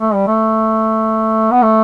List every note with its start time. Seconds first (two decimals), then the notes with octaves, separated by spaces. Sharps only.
0.01 A3
0.14 G3
0.27 A3
1.51 B3
1.62 A3